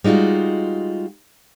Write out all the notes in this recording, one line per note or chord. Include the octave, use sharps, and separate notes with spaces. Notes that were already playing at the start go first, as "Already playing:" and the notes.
G3 G#3 D#4 F4 F#4